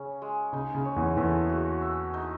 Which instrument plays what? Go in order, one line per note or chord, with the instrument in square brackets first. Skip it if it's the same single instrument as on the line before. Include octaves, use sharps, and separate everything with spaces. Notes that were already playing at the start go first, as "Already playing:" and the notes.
Already playing: [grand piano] C#3 [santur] C#4
[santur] G#3
[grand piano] C#3 [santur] D#4
[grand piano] C#3
[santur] C#5
[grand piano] E2 E3
[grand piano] E2 E3 [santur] A3
[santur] F#4
E5
D#4